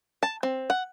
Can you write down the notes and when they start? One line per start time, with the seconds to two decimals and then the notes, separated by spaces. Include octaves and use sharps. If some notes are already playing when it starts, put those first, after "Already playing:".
0.23 A5
0.43 C4
0.70 F#5